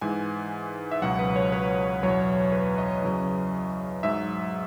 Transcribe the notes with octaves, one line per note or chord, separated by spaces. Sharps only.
G#2 E3 G#5
E5
C#2 B2 F#3 F#5
B4
C#5
B4
E2 B2 F#3 C#5
B4
D#5
E2 C#3 F#3
G#2 F#3 E5